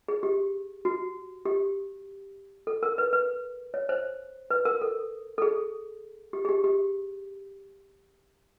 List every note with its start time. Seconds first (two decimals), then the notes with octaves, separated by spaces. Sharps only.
0.08 G#4
0.23 G4
0.85 F#4
1.45 G4
2.67 A4
2.83 A#4
2.98 B4
3.13 B4
3.74 C#5
3.89 C5
4.50 B4
4.65 A#4
4.81 A4
5.38 A4
5.42 G#4
6.33 G4
6.45 G#4
6.49 G4
6.64 G4